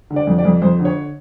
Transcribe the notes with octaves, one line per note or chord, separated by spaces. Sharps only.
D3
D5
F2
D5
F2
F2 C5
D3
C#5